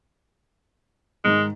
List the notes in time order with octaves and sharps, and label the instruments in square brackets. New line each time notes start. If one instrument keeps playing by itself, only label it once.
[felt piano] G#2 D#3 [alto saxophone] G#3